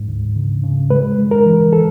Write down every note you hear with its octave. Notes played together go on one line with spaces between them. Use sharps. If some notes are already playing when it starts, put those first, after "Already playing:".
Already playing: G#2
D2
C#3
C#3
G#3 B4
G#3
A#4
E3
A4